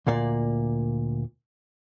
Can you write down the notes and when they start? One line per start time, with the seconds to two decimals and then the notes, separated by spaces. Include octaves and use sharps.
0.07 D2 A#2 A#3 D5